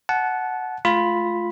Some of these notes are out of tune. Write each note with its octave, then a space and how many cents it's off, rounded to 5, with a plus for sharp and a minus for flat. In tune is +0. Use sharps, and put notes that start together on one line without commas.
F#5 +0 A5 -25
A3 -35 F4 +0 B5 +0